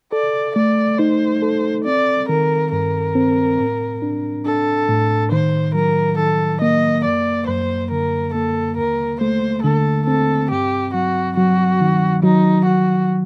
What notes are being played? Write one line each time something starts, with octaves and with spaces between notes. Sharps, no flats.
A4 D5
A3 D5
D#4 C5
A4
C4 D5
D#3 A#4
G2 A#4
C4
A2
D4
D4 A4
A2
D#3 C5
F#3 A#4
D#3 A4
A#3 D#5
F#2 D5
F#2 C5
D3 A#4
A#3 A4
D#2 A#4
A3 C5
D3 A4
C4 A4
G2 G4
F#3 F#4
F#3 F#4
D#3
F#3 D#4
F#3 F#4